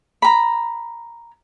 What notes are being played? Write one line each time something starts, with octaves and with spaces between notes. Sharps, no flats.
A#5 B5